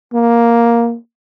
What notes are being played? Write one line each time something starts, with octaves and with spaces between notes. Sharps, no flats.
A#3